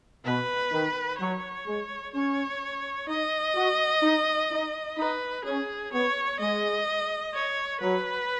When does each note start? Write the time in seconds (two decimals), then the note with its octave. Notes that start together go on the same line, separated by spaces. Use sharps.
0.25 B2 B4
0.72 D#3
1.19 F#3 C#5
1.66 G#3
2.14 C#4 C#5
3.08 D#4 D#5
3.56 F#4
4.03 D#4
4.51 D#4
4.98 D#4 B4
5.44 C#4 G#4
5.92 B3 C#5
6.40 G#3 D#5
7.34 C#5
7.81 F#3 B4